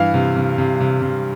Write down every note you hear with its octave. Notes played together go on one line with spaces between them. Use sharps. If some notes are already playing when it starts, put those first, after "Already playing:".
Already playing: G2 E3 F5
C3
C3
C3
C3
C3